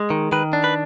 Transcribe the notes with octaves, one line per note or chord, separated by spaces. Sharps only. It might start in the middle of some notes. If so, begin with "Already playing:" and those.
Already playing: G#3
D#3
D#3 B4
D4
B4